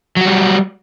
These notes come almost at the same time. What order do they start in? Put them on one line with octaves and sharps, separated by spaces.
F#3 F#4 G3